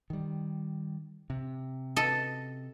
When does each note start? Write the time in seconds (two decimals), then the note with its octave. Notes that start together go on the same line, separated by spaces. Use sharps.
0.10 D#3 G3
1.30 C3
1.96 A4 D#5